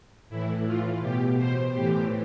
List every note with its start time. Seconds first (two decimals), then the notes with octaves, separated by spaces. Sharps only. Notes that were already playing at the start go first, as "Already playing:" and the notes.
0.29 A2 E3 E4
0.65 F4
1.01 B2 G4
1.37 C5
1.73 A2 E3 G4